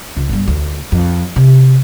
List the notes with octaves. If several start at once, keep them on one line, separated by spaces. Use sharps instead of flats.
C#2
G1 G3
D2
F2
C3